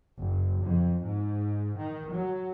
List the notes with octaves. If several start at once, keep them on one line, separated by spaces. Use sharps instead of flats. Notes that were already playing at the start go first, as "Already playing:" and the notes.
F#1
F2
G#2
D#3
F#3